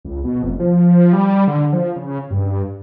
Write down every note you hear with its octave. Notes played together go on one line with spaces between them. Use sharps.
C#2
B2
F1
F3
G3
D3
F3
C#3
G2